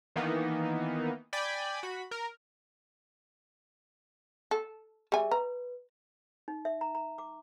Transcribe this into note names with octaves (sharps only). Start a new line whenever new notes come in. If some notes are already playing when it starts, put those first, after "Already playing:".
D#3 E3 A#3 B3 D#4
D5 G5 G#5 B5
F#4 B5
A#4
A4
G3 G#4 E5 G#5
B4 A#5
D#4
E5
A#5
A#5
D6